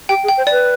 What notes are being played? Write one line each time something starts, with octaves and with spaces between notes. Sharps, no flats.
G4 G5
G#4
G5
C5
B4 D5